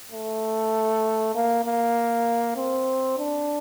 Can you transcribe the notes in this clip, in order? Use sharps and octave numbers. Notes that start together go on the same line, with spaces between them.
A3
A#3
A#3
C4
D4